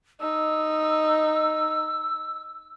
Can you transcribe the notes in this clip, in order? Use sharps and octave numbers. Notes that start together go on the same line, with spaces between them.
D#4 E6